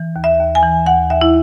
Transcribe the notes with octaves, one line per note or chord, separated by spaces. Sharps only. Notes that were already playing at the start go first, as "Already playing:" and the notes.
Already playing: E3
D#2
E5
D#2
G#5
E3
D#2 F#5
D#2 E5
E4